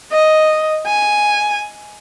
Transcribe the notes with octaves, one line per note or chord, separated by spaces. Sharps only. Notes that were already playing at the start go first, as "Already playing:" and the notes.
D#5
G#5